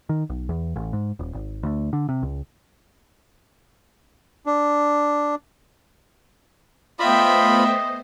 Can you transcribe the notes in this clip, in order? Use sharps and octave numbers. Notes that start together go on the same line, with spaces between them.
D#3
B1
E2
A1
G#2
D#1
G#1
D2
D3
C3
C#2
D4
A3 B3 F4 C5 D#5 E5 G5 B5